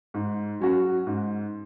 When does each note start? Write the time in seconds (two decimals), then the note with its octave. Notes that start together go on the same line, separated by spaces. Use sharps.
0.14 G#2
0.60 F#3 C#4 F#4
1.07 G#2